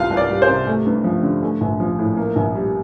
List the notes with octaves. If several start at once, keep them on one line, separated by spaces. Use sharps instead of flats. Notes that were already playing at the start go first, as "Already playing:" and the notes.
Already playing: C2 F4 F5
C2
D5
G3
C5
C3
A3
G2
F3
D3
A3
A#1
F3
A2
A#3
A#1
G3